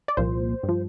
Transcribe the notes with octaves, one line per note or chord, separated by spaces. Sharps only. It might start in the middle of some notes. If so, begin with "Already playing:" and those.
D5
C2 A#2 F3 C5
G2
F3